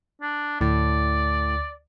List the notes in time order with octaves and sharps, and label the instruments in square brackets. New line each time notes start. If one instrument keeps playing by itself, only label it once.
[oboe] D4
[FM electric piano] D2 [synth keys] A2 [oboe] D5